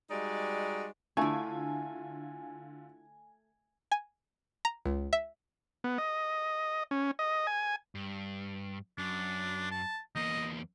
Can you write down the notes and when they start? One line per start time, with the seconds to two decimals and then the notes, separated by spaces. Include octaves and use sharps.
0.11 G3 G#3 D#4 F#4 D5
1.17 D3 A3 D4 E4 F4 G#5
3.92 G#5
4.65 A#5
4.85 C#2
5.13 E5
5.84 B3
5.98 D#5
6.91 C#4
7.19 D#5
7.47 G#5
7.95 G2
8.98 F#2 D4
9.71 A5
10.15 E2 A#3 D#5